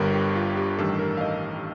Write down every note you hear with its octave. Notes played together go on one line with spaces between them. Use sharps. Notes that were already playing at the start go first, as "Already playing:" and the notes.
Already playing: G1 G2 D3 G3 A#4
G4
F4
G4
A1 G2 D#3 G3 A4
A#4
F5
D#5